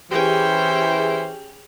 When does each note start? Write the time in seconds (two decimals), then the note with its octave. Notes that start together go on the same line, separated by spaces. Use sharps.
0.11 E3 C#4 G4 G#4 C5 G5